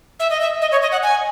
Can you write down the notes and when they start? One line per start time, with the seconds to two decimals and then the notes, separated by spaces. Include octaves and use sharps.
0.20 E5
0.30 D#5
0.41 E5
0.62 D#5
0.71 C#5
0.82 D#5
0.92 F#5
1.03 G#5